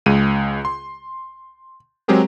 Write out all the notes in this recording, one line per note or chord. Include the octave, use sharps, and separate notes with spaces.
C#2 G#3 D#7
C6
F#3 G#3 C4 G4 G#4 A#4